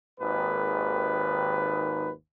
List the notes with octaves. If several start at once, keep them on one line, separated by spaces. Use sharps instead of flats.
G#1 D#2 G#2 D#3 B4